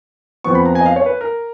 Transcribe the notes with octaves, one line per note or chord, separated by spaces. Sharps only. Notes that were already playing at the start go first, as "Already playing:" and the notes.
F2 F3 B3 C#6
B5
A#5
G#5
D#5
F5
C#5
B4
A#4